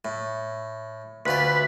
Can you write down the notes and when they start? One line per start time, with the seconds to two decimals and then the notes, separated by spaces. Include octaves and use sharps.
0.05 A2
1.26 D2 F4 B4 D5